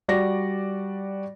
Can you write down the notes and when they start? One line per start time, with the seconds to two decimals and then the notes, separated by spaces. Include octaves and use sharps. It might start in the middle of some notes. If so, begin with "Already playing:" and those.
0.08 G3 F#4 D5 A#6